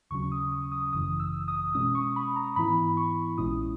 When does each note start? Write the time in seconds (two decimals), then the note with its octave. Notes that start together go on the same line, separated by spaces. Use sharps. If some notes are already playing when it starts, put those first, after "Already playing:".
0.10 D#2 C#3 F#3 C#4 C#6
0.32 D#6
0.52 D#6
0.72 D#6
0.92 G#1 F#2 C#3 E3 D#6
1.20 E6
1.48 D#6
1.75 B2 G#3 C#4 D#6
1.95 C#6
2.16 B5
2.36 A#5
2.56 G#2 E3 B3 E4 B5
2.97 C#6
3.38 A#1 A#2 G#3 C#4 E4 D#6